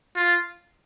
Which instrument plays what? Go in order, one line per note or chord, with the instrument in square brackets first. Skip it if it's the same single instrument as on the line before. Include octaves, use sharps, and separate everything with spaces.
[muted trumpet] F4